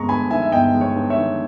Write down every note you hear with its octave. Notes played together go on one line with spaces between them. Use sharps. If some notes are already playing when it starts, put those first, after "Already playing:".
Already playing: G1 G#3 A#5 C#6
G2 G#5 B5
D#3 E5 G#5
E5
G1 D#5 G5
G#3
C#5
G2
C#5 E5
D#3